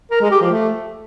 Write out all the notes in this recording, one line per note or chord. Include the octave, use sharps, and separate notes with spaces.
A#4
G#3
G4
F3
A3